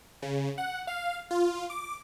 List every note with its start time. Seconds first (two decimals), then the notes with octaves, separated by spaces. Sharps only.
0.22 C#3
0.58 F#5
0.87 F5
1.31 F4
1.70 D6